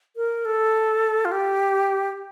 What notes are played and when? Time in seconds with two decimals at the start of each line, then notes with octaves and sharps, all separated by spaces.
0.16 A#4
0.45 A4
1.25 F4
1.32 G4